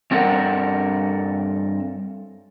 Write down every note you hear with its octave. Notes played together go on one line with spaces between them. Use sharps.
G2 C4 A4 A#4 F#5